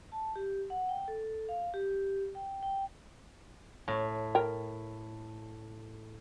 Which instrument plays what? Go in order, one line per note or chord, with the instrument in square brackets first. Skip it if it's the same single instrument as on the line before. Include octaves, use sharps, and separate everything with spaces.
[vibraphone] A5
G4
F#5
G5
A4
F5
G4
G5
G5
[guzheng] A2
[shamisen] A#4 G5